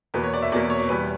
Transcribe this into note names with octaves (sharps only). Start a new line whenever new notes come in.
E2 B2 A#3 B4
C#5
D5
E5
E2 B2 A#3 D5
C#5
E2 B2 G3 B4